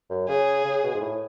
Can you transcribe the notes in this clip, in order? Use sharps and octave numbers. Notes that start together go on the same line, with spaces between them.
F#2
C#3 G#4
C#3
B2
G#2
A2